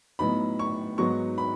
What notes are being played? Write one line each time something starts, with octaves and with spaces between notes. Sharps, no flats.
A2 F#3 B3 D#4 B5
C#6
G#2 F#3 B3 D#4 C#6
B5